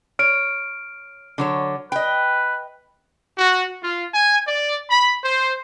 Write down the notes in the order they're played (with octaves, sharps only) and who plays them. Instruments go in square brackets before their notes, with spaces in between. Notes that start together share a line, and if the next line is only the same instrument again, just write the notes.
[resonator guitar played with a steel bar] C#5 [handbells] F6 D7
[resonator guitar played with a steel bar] D3 F#3 C#5
[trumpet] B4 [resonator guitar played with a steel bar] D#5 G5
[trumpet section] F#4
F4
G#5
D5
B5
C5